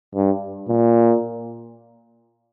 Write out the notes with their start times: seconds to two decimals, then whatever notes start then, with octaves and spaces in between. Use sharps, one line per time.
0.15 G2
0.68 A#2